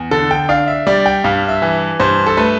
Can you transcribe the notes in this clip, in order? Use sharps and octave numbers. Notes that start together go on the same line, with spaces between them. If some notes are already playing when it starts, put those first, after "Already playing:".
Already playing: E2
D3 A4
G5
D4 F5
E5
G3 D5
G5
G2 F5
E5
E3
G2 C5
A4
A3 B4